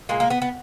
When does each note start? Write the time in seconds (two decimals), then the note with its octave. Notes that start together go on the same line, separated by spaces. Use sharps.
0.09 A#2 G#3 A#3
0.20 A#3
0.30 B3
0.42 B3